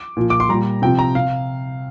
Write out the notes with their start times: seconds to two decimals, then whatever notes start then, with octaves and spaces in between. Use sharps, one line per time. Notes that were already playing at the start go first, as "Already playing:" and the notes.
Already playing: D6
0.17 A#2 F3
0.30 D6
0.40 C6
0.49 A#2 G3 A#5
0.82 C3 F3 G5
0.99 A#5
1.15 C3 F5